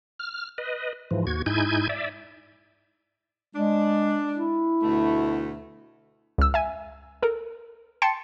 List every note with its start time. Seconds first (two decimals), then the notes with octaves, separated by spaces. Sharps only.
0.19 F6
0.58 B4 D#5
1.11 G#2 E3 F3
1.27 D#2 F#4 G#6
1.46 G#2 D#4 E4 G#5 G6 G#6
1.89 D5 E5
3.55 G#3 D4
4.34 E4
4.82 D2 B2 A3
6.38 C#2 E6
6.54 E5 G#5
7.22 A4 A#4
8.02 G5 A5 C6 A6 C7 C#7